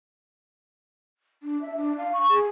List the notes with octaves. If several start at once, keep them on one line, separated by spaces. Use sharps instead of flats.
D4
E5
D4
F5
C#6
G#4